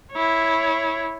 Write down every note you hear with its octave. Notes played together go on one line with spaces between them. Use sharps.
E4 C#5